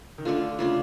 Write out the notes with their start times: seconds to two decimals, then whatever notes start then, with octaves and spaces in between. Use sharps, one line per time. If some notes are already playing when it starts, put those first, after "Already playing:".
0.18 D#3
0.25 D3 A3 D4 F4
0.59 C#3 A3 D4 F4